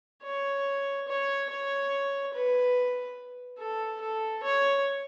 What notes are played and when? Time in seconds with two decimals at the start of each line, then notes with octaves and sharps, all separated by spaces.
0.24 C#5
1.08 C#5
1.50 C#5
2.34 B4
3.59 A4
4.01 A4
4.43 C#5